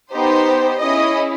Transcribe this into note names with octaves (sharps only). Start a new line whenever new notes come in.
B3 D#4 G4 C5
C#4 E4 G#4 D#5